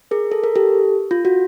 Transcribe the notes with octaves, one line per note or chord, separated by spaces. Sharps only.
G#4 A#4
A4
A#4
G4 A4
F4
F#4